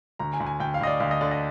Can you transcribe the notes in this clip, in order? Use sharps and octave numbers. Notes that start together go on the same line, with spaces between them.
D2 A#5
G#5
D2
G#5
D2 G5
F5
D2 D#5
D5
D2 F5
D#5
D3 D5
D#5